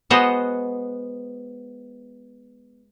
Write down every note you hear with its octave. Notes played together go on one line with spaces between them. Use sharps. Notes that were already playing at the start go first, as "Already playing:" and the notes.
G#3 B3 F#4 C5 D#5 F#5